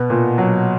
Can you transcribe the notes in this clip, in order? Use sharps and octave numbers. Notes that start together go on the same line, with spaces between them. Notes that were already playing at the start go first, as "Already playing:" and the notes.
Already playing: B2 B3
A#2
F#3